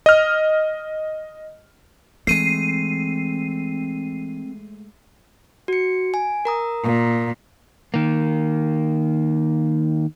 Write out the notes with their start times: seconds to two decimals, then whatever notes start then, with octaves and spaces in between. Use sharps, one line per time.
0.06 D#5 F6
2.27 E3 G#3 A3 C4 C7 D#7
5.68 F#4 C#7
6.14 G#5
6.45 A#4 A#5 D#6
6.84 A#2
7.94 D#3 A#3